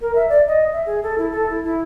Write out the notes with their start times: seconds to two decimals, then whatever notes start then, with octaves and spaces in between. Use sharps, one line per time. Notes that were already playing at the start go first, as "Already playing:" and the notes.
0.01 A#4
0.15 E5
0.29 D5
0.48 D#5
0.73 E5
0.86 G#4
1.03 A4
1.18 E4
1.32 A4
1.50 E4
1.64 E4